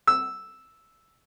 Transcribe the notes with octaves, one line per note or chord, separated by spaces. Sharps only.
E6